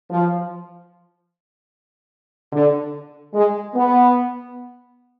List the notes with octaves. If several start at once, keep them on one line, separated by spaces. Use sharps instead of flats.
F3
D3
G#3
B3